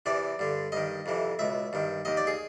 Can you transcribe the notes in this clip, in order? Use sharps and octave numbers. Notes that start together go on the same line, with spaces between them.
E2 C3 E3 D5
G2 D3
G2 D#3 D#5
F2 C3 E3
C#2 B2 E5
G2 D#3
D#2 D#3 D#5
D5
G#4